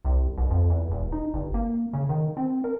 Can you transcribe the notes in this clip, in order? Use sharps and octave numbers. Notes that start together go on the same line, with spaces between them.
C2
B1
F2
E2
E1
D#4
G1
A#3
C#3
D#3
C4
A#4